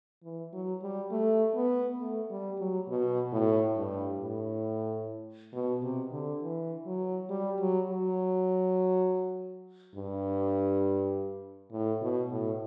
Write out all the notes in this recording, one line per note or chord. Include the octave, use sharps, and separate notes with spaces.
E3
F#3
G3
A3
B3
A3
G3
F#3
B2
A2
G2
A2
B2
C3
D3
E3
F#3
G3
F#3
F#3
G2
A2
B2
A2